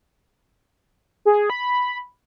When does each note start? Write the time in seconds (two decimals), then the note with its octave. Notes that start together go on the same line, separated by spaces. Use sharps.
1.25 G#4
1.50 B5